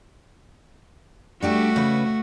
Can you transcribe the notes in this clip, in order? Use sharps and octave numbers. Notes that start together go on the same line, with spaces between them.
G3 A3 D4 F#4 G4
C#3 B4